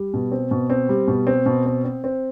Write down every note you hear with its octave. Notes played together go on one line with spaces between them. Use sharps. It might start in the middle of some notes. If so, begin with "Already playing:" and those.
Already playing: G3
B2
C4
B2
C4
G3
B2
C4
B2
C4
C4
C4